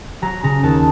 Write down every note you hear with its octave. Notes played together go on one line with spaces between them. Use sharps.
F#3 A#5
C#3 A#5
D#2 A5